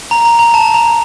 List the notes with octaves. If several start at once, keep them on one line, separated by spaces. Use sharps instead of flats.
A#5
A#5
A#5
A5
A#5